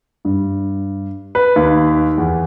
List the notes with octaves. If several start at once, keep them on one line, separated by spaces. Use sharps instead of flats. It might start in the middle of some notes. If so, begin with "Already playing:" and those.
G2
B4
D#2
E2